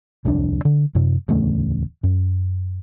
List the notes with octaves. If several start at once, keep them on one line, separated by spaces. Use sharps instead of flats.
D1 C2 F2 D4
D3
F#2 C3
D1 E2 C#3 A3
F#2